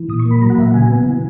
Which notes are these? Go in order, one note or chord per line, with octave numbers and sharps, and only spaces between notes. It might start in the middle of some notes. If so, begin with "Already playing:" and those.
Already playing: E3
A#2 D#6
C#6
A#3
B5
F#3 A#5
F#5
A#2 E5
F#5
C#3 G#5
B3
E3